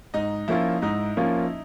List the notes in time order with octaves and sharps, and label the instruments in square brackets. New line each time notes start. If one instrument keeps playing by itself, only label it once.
[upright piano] G#2 [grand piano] D#4 D#5
[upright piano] F3 A#3 C#4 F4 [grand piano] E4 E5
[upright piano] G#2 [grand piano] D#4 D#5
[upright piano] F3 A#3 C#4 F4